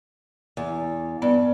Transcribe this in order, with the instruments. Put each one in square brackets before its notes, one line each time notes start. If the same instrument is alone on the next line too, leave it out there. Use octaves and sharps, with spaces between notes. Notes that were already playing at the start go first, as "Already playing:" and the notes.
[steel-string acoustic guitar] E2
[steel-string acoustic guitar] G2 [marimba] B3